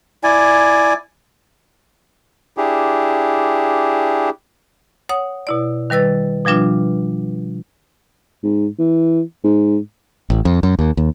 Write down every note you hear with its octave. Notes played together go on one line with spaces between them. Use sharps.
E4 D5 G#5
D4 E4 G4 G#4
C#5 F#5 D#6
B2 E4 D5
D#3 G3 B4 E6 A6
B2 F3 G3 D4 F4
G#2
E3
G#2
A1
F2
F#2
D#2
D#2